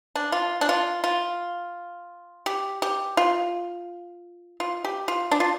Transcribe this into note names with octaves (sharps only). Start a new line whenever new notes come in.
D4
F4
D4
F4
F4
G4
G4
F4
F4
G4
F4
D4
F4